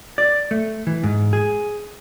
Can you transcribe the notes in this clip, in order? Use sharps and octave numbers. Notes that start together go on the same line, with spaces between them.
D5
A3
E3
G#2
G#4